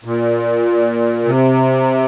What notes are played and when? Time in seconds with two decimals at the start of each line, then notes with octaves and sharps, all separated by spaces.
0.04 A#2
1.25 C3